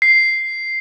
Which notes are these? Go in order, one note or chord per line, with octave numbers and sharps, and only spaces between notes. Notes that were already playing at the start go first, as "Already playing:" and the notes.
C7